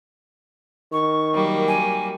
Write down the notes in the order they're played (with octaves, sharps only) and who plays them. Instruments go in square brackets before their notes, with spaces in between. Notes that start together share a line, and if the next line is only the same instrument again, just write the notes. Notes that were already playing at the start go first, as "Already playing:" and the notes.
[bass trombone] D#3 [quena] C#6
[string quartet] F#3 G3 A#3
[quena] G#5